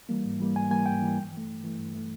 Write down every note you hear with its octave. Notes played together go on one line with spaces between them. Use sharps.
E3 G3 A#3
G#2
E3 G3 A#3
G#2 G#5
E3 G3 A#3 G#5
G#2 G5
E3 G3 A#3
G2
E3
A3
G2
E3 A3
G2
E3 A3